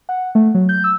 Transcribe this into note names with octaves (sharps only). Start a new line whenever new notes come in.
F#5
A3
F#3
G6
E6